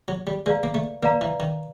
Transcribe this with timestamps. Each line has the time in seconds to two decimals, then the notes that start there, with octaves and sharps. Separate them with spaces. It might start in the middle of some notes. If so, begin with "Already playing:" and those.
0.08 F#3
0.27 G3
0.46 G#3 B4 D5 F5 A#5
0.63 A#3
0.74 A3
1.02 A#3 B4 D5 F5 A#5
1.21 E3
1.40 D#3